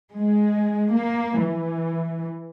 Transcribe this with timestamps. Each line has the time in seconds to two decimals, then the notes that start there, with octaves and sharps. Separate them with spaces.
0.16 G#3
0.92 A#3
1.41 E3